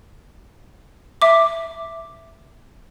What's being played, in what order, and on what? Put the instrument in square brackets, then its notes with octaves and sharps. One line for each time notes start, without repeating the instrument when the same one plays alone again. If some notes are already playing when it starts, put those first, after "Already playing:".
[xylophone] E5 D6